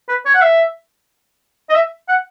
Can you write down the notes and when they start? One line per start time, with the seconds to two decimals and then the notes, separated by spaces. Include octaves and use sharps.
0.08 B4
0.25 C#5
0.34 F#5
0.41 E5
1.69 D#5
1.75 E5
2.08 F#5